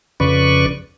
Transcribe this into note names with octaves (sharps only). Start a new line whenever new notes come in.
F2 C#3 B4 D5 C#6